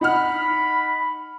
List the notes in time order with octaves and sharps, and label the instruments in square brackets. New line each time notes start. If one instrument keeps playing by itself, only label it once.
[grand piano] D#4 F#5 F6 [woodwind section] B5